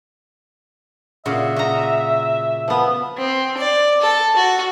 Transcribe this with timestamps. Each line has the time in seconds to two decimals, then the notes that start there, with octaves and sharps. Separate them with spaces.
1.26 A#2 C#3 F#4 E5
1.56 F#4 D#5 A#5
2.68 F3 B3
3.17 C4
3.58 D5
4.02 A4
4.36 F#4